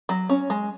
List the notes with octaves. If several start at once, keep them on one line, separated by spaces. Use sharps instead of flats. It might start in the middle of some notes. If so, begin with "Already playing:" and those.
F#3
C#4
G#3